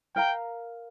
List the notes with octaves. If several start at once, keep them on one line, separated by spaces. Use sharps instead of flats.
A#4 F5 G5 A#5